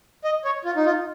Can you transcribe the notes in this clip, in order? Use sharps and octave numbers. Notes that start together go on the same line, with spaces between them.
D#5
C#5
F4
D#4
F4